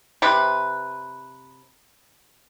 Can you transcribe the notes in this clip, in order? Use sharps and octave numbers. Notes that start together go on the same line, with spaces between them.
C3 B4